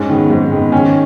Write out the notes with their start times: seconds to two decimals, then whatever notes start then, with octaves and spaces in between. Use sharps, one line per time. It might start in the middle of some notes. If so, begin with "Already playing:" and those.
Already playing: G#2 C#4
0.10 D#3 G#3 B3
0.30 G#2 C4
0.52 D#3 G#3 B3
0.72 D#3 C#4